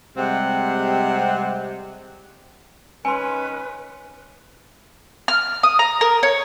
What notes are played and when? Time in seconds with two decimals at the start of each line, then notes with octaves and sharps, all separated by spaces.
0.17 C3 G3 G#3 C4 G4 F#5
3.05 D#3 G#3 C#4 B4 G#5 C6
5.28 F6
5.63 D#6
5.79 A#5
6.01 A#4
6.23 C#5